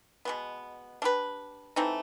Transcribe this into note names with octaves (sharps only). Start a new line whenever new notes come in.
B2 G#3 B3
A3 D4 G4 B4
E3 A3 C4 D#4